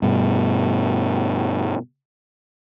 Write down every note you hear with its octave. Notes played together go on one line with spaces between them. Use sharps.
G2 B2